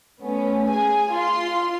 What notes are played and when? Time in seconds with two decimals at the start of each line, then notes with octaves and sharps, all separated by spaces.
0.20 A3 B3 C#4
0.69 G#4 G#5
1.12 F4 C6